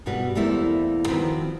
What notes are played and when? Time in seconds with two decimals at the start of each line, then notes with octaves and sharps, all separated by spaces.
0.06 G2 B2 G3 F#4 B4
0.35 E2 G3 A3 A#3 E4 C5
1.07 D#3 F3 C4 F#4 B4